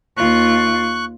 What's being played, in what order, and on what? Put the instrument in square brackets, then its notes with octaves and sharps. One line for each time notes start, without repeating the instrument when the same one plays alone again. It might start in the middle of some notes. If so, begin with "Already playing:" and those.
[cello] D#2 F4 [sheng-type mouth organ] C#6 F#6